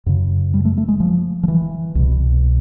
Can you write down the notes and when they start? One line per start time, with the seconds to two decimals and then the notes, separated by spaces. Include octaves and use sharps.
0.06 F#2 C#3
0.54 G3
0.65 A3
0.78 A3
0.88 G#3
1.00 F3
1.43 F3
1.48 E3
1.95 C2 B2